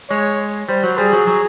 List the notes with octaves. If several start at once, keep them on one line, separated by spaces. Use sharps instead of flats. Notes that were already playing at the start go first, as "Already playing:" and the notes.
G#3 C#5
G3 C5
F#3
G3 G#4
F#3
F#3